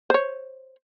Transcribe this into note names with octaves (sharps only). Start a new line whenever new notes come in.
C5 C#5